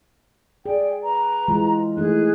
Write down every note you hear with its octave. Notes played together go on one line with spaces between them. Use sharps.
G#4 D5 G5
B4 A#5
E3 G#3 F4
E3 A3 D#4 G#4 F#6